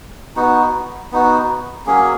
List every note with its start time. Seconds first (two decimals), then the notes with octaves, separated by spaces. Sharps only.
0.36 B3 D#4 F#4
1.12 B3 D#4 F#4
1.86 F#3 A#3 C#4 G#4